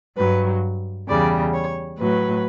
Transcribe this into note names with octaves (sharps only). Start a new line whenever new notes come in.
G2 F#3 B4
E2 C#3 G3 D5
C#5
A2 F#3 B4